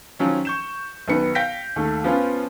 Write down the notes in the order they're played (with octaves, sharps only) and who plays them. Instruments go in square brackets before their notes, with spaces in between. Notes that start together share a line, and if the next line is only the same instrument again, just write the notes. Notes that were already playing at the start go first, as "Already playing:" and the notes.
[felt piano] D#3 F3 F#3 C#4
C#6 G6 E7
B1 D#3 B3 C#7
F5 G5 G6 A#6 B6 D7
D#2 D#3 A3
F3 B3 C#4 F4